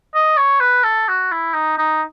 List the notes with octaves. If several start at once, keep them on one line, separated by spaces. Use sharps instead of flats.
D#5
C#5
B4
A4
F#4
E4
D#4
D#4